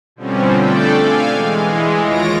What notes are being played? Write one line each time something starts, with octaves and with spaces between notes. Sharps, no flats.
B2 D3 F3 G3 C4 C#4
A3 D4 A4 D5 G5
F5 G#5
E3 G#3
D#2 F4 C#5 A#6 D7